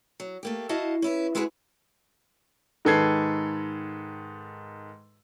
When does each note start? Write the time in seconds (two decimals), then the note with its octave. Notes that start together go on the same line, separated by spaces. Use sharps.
0.20 F#3
0.43 A3 A#3 G4
0.69 E4 F#4 D#5 F5 A5
1.02 C#4 E4 B4
1.35 G#3 E4 F#4 G#4 A4 B4
2.85 G#2 D#3 A4 B4 G#6 C7